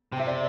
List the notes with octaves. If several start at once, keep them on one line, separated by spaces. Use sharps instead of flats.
C3 G5
E5
D5